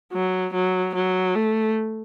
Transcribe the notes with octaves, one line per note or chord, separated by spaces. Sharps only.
F#3
F#3
F#3
A3